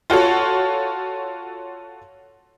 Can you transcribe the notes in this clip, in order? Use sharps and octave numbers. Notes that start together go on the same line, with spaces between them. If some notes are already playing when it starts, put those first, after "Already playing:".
F4 F#4 A4 C#5